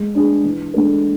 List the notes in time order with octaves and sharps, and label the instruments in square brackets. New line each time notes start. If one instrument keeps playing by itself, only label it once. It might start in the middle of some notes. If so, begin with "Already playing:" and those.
Already playing: [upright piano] G#3
D4 G#4
E3
G#3 D4 A4